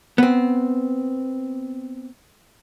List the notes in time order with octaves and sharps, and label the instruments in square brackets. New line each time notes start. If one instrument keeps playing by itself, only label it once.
[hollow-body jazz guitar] B3 C4